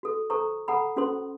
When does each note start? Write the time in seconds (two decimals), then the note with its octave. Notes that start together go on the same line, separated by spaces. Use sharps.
0.03 F#4 A4
0.30 A4 C5 A#5 C#6
0.68 A4 F#5 A#5 B5
0.96 C#4 F#4 A4 C5 C6